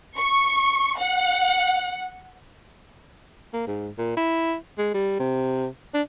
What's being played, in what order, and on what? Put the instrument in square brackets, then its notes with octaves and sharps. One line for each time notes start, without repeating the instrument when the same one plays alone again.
[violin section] C#6
F#5
[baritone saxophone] A#3
G#2
A#2
E4
G#3
G3
C3
D4